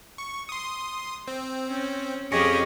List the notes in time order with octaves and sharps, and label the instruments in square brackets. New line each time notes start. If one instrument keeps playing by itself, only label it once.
[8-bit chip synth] C#6
C6 D#6
C4
[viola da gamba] C#4
[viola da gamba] F2 G4 G#4 [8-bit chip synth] C#4 D#5 [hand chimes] C#6 A#6 C#7